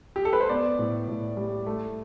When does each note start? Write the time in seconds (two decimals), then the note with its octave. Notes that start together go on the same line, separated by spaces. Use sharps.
0.16 G4
0.25 A4
0.33 B4
0.40 C5
0.50 B3 D5
0.79 A2
1.08 A2
1.37 G3
1.66 A3